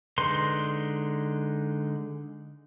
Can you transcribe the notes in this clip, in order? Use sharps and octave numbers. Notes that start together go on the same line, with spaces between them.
D3 G#3 D#4 B4 C6